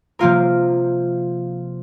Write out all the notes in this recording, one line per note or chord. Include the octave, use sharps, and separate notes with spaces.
C3 F3 A#3 F4 A#4